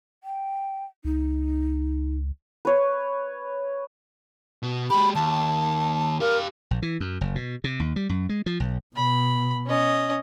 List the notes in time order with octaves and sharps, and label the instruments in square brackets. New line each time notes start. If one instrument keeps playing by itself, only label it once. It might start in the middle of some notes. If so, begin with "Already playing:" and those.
[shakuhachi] G5
[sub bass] C#2 [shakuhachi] D#4
[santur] B4 C#5
[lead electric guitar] B2
[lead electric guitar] G#3 G4 [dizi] B5
[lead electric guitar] D#2 [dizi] A5
[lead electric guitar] G4 F5 [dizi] A#4
[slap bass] A#1
E3
F#2
F#1
B2
C3
D#2
G3
F#2
G#3
F3
B1
[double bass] B2 [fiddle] B5
[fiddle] C#4 D#5